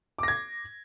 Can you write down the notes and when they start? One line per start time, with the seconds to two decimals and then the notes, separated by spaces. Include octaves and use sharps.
0.18 D6
0.23 A#6
0.28 G#6